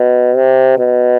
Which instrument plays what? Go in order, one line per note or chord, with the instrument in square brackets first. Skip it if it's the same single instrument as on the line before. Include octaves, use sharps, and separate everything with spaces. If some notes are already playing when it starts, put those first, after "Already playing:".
Already playing: [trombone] B2
C3
B2